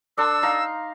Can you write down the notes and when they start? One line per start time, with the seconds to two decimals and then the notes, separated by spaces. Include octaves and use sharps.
0.18 D4 A4 C6 E6
0.42 D#4 F5 A#5